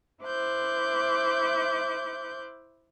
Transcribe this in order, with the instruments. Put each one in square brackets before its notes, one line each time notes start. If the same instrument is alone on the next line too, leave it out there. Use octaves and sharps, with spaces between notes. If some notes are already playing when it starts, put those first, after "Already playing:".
[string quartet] E4 C5 D6 F#6 G6